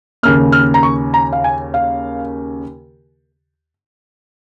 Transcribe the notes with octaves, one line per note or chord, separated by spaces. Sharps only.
D#2 C#3 A#3 F6
F6
A#5
C#6
A#5
F5
G#5
F5